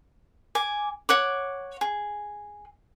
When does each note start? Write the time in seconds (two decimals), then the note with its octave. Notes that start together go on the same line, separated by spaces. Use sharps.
0.55 G#5 D6
1.09 C#5 F#5 D6
1.81 G#4